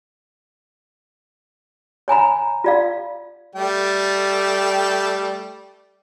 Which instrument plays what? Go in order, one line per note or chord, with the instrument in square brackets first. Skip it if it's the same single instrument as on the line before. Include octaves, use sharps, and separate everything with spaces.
[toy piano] C#5 G#5 A#5 B5
F4 D5 F5
[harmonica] G3 A3 G5